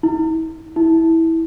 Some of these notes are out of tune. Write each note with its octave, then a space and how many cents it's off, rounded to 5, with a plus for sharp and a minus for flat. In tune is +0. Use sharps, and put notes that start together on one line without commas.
E4 -40
E4 -15